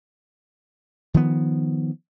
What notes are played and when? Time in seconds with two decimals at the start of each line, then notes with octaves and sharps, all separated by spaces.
1.14 D#3 F3 B3